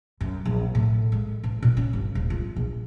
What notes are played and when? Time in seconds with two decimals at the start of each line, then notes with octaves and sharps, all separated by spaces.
0.21 F#2
0.45 A#1
0.75 A2
1.12 G#3
1.44 A1
1.62 A#2
1.77 C#4
1.93 G1
2.15 D1
2.30 F4
2.56 A#1